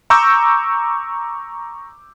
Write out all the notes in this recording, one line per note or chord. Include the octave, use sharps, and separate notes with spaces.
A#5 C#6 D6 E6 G6